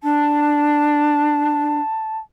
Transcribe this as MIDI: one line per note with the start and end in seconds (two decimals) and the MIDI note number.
0.03 1.79 62
0.03 2.18 81